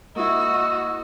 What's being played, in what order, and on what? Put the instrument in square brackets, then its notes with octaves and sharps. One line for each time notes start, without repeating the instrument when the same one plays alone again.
[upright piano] A#3 E4 [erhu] F#4 [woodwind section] D#5 E6